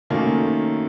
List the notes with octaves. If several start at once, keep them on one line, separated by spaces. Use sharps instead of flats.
F#2 D#3 A3 A#3